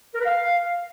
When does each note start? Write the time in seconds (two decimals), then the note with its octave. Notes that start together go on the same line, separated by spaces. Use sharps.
0.14 A#4
0.20 B4
0.25 F5